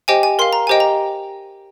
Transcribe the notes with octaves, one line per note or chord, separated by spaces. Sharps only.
G4 C5 D#5 G5 G#5
G#5
A#4 F5 C6
A#5
G4 C5 D#5 G5 G#5
A#5